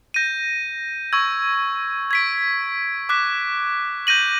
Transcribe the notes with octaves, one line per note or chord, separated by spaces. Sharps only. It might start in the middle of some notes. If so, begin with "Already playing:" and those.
G6 A#6 D#7
C#6 E6 G#6
G#6 B6 D7
D6 F#6 B6
G6 A#6 D#7 F#7